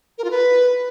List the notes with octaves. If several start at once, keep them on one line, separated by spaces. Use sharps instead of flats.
A#4
F4
B4